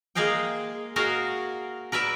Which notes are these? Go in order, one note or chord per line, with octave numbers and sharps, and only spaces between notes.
G#3 A#3 G#4 D#5 F5 G5
F#4 G#4 A#4 D#5 F5
A#4 B4 D5 E5